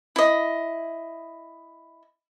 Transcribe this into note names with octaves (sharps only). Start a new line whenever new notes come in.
E4 D#5